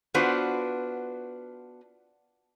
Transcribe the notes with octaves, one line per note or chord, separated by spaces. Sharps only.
B3 D4 F4 F#4 B4 C5